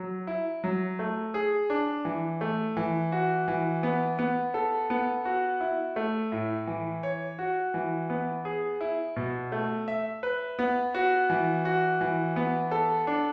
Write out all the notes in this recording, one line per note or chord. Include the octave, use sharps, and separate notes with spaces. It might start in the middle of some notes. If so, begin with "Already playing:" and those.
Already playing: F#3
E4
F#3
A3
G#4
D4
E3
A3
E3
F#4
E3
B3
B3
A4
B3
F#4
E4
A3
A2
E3
C#5
F#4
E3
B3
G#4
E4
B2
A3
E5
B4
B3
F#4
E3
F#4
E3
B3
A4
D4